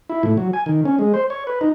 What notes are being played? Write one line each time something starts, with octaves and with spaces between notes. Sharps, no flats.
E4
A2
F#3
G#5
D#3
C#4
G#3
C5
C#5
B4
D#4